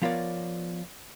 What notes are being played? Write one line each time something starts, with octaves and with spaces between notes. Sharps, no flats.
F3 B3 F4 A#4 C#5 D5